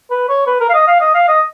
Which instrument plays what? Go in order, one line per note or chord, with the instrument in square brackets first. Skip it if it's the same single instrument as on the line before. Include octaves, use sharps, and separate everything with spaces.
[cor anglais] B4
C#5
B4
A#4
F5
D#5
F5
D#5
F5
D#5